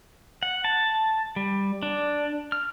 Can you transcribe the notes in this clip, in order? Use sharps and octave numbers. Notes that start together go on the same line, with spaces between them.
F#5
A5
G3
D4
F6